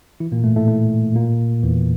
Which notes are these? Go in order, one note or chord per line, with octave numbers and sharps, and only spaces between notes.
E3 E4
A#2 A#3
A2 A3
A2 A3
A2 A3
A#2 A#3
E2 E3